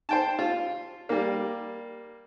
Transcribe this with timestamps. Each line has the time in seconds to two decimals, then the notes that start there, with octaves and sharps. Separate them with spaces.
0.09 C5 G5 A5
0.39 F4
1.09 G3 A#3